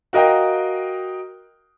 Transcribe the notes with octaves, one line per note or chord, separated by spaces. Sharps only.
F#4 A#4 D#5 F5 G5